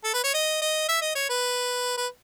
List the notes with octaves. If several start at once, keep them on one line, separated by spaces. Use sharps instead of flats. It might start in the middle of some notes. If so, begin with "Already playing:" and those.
A4
B4
C#5
D#5
D#5
E5
D#5
C#5
B4
B4